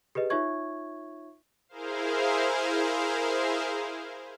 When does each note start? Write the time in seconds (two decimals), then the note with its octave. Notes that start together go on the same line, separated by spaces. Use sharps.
0.15 G4 G#4 B4 D#5
0.30 D#4 F4 C#5 E5 C#6 G#6
1.69 E4 G#4 A#4 C5 F5